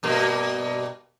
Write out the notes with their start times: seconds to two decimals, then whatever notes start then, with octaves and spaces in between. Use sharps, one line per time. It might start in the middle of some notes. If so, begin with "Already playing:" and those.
0.03 G2 B2 A#3